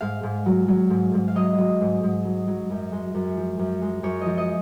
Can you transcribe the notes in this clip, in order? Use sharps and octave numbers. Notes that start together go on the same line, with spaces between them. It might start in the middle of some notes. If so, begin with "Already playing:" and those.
G#2 F5
G#2
F#3
F#3
G#2
G#2
F5
F#3 D#5
F#3
G#2
G#2
F#3
F#3
F#2
G#3
F#2
F3
F#2
G#3
F#2 C#5
F3 D#5
D#5